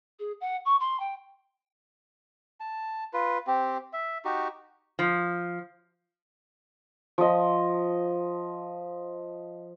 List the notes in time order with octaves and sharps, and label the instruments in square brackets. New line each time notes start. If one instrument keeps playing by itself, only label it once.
[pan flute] G#4
F#5
C#6
C6
G5
[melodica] A5
F4 B4
C4 G4
E5
D#4 F#4 G4
[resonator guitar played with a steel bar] F3
[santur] F3 D#5